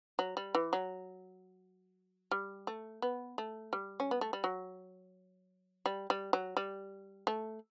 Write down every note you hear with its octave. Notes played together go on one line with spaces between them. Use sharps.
F#3
G3
E3
F#3
G3
A3
B3
A3
G3
C#4
B3
A3
G3
F#3
G3
G3
F#3
G3
A3